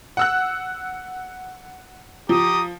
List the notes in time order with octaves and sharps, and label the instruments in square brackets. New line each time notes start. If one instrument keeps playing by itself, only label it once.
[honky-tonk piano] F#5 E6 F#6
[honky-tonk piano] F3 [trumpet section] G4 A#5 D#6